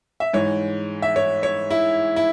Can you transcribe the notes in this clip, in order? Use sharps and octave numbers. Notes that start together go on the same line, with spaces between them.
E5
G#2 E3 C#5
E5
C#5
C#5
E4
E4